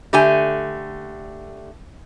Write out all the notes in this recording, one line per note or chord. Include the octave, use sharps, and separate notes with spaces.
D3 A3 G4 G#5